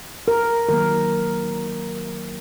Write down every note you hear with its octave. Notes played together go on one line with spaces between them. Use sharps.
A#4
D#3 F#3 A#3 A#4